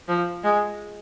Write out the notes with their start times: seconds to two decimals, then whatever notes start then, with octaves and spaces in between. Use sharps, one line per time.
0.08 F3
0.44 G#3